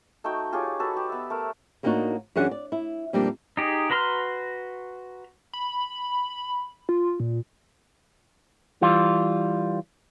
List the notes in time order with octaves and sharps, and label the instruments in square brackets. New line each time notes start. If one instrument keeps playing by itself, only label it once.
[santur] A3 D#4 F#4 G5
F4 G4 G#4 C#5
F#4 A4 B4
G4
B3 E5
A3 A#4
[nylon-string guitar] A2 A#3 B3 D4 D#4 F#4
F#2 E3 C#4 D4 G#4 F#5
D5
E4
F2 A#2 G3 A#3 C4 D4
[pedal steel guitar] D#4 G4 G#4
F#4 B4 A#5 C6 F6
[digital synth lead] B5
F4
A#2
[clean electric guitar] E3 G3 F4